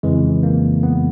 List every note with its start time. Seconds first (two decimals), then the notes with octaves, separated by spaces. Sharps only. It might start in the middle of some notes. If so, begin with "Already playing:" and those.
0.03 F2 C#3 E3 G#3
0.43 A#3
0.83 B3